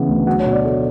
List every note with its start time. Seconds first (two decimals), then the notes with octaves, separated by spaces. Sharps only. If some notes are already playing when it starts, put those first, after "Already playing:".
Already playing: C#3 E3 B3
0.08 D2
0.27 F#3 F#5
0.40 C#5
0.46 B2
0.52 D5
0.65 A3